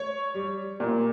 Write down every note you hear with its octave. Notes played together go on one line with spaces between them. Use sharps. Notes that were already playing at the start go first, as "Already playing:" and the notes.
Already playing: C#5
G3
A#2